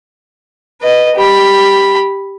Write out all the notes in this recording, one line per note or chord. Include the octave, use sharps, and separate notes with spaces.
B4 D#5
G4 B5